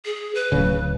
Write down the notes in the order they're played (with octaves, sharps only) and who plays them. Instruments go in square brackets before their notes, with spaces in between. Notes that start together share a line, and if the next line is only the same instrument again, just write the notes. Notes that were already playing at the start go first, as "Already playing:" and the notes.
[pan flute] G#4
B4
[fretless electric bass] D1 C#3